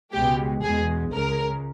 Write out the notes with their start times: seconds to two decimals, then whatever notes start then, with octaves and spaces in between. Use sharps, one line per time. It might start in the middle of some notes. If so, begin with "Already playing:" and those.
0.13 C#2 B2 G#3 G4
0.63 E2 B2 G#3 G#4
1.13 C#2 C#3 G#3 A#4